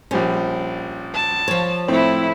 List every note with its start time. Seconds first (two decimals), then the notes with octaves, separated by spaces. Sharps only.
0.11 A#1 G3 C#4 C5
1.14 A5
1.48 F3 C#5
1.88 A2 A3 C4 E4